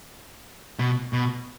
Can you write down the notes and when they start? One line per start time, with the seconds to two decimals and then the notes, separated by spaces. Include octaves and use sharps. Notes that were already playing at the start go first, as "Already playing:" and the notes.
0.79 B2
1.13 B2